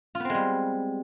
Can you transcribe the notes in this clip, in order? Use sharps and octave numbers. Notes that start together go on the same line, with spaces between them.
G3 G#3 B3 C4 F4